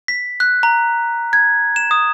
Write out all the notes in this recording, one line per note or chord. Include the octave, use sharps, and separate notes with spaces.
B6
F#6
A#5
G#6
E7
D#6